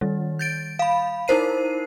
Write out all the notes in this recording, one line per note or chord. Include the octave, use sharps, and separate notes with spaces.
D#3 G3
G6 A6 D7
F5 B5
D#4 E4 A#4 C5 C7 D#7